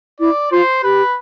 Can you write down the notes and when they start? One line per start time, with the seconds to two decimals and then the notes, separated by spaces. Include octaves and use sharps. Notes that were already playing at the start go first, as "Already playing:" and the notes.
0.20 E4 D5
0.51 F4 C5
0.83 G4 B4